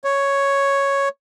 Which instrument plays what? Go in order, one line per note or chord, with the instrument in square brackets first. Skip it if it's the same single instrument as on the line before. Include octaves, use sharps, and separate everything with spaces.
[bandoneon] C#5